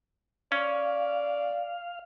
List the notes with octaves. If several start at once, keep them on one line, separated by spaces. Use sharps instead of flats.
C#4 D5 F5